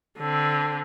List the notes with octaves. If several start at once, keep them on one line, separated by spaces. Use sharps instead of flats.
D3 C4